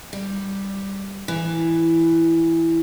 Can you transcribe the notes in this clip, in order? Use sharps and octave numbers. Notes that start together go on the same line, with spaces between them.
G3
E3